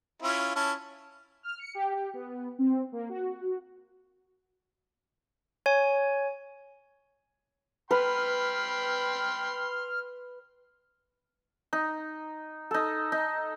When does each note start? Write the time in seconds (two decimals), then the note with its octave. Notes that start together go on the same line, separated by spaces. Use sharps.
0.22 C#4 E4 F4
0.56 C#4 E4 A5
1.43 F6
1.59 C#7
1.75 G4
1.94 G4
2.14 B3
2.59 C4
2.92 A#3
3.09 F#4
5.66 C#5 G#5
7.91 B4 G5 B5 C6 F6
11.73 D#4
12.71 D#4 A4
13.12 D#4